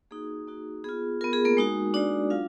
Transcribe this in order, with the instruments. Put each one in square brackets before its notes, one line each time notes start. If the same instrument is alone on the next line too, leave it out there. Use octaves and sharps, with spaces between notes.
[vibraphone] A#3 D#4 F#4 G#4
A#3 D#4 F#4
B3 F4 G#4
B3 F4 A#4
G#4
A#3 A#4
G#3 D#4 F#4
G#3 D4 D#4 F#4 D5
F#3 D4 F4 F5